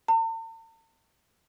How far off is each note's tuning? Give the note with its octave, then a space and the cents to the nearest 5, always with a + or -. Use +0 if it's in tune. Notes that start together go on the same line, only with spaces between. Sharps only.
A5 +45